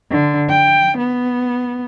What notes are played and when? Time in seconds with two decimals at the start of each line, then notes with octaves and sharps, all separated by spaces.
0.11 D3
0.50 G5
0.98 B3